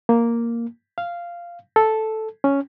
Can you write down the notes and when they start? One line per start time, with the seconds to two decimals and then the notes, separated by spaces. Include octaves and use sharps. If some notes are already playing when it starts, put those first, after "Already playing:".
0.09 A#3
0.98 F5
1.76 A4
2.44 C#4